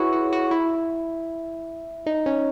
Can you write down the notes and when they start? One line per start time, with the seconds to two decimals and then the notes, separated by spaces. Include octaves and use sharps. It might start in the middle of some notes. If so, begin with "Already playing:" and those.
Already playing: E4 F#4 G#4 B4 C#5
0.13 F#4
0.33 F#4
0.51 E4
2.06 D#4
2.26 C#4